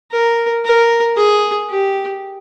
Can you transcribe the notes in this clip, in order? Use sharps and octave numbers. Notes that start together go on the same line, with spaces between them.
A#4
A#4
G#4
G4